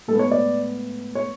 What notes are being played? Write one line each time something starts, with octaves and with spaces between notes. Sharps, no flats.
A2 G#3 B3 A4
C#5
D5
C#5